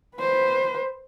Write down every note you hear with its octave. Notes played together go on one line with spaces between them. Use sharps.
B4 C5